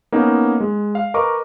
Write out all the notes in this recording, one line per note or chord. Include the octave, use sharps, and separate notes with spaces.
A#3 B3 C#4 D#4
G#3
F5
A#4 B4 D#5 C#6 D6